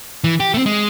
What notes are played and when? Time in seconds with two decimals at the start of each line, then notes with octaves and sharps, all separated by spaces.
0.24 E3
0.40 G4
0.54 A3 C4
0.66 G#3